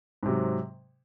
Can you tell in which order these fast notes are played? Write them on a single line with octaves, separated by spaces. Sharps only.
G#2 C3 F#3